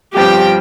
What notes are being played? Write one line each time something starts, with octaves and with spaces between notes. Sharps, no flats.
G1 G2 F3 C4 G4 G5